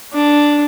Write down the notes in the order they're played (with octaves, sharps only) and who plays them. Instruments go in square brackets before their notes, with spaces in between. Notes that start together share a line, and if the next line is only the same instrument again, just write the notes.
[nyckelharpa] D4